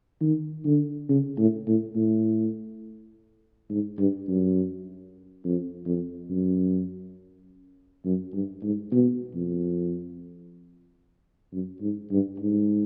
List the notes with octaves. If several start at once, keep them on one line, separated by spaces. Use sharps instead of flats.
D#3
D3
C#3
A2
A2
A2
G#2
G2
F#2
F2
F2
F#2
F#2
G2
G#2
B2
F2
F#2
G#2
G2
G#2